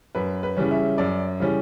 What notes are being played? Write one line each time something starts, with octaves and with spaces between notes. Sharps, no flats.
F#2 B4
B4
C#3 E3 G3 C#4
E5
F#2 D5
C#3 E3 G3 C#4